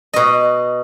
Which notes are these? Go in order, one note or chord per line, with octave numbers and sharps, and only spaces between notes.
B2 D#5